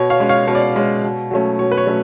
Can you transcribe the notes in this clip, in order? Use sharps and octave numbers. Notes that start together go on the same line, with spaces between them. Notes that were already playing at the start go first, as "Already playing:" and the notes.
Already playing: B2 C#5
C#5 F5
G#3 C#4
C#5 F5
B2 C#5
D5
C#5
G#3 C#4
B2
F#3 A3 C#4
B2 C#5
B4
C#5
F#3 A3 C#4